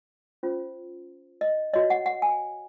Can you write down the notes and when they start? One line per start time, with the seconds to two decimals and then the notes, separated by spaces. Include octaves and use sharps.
0.43 C#4 F4 C5
1.41 D#5
1.74 F#4 C#5 D#5
1.90 F#5
2.06 F#5
2.22 G#5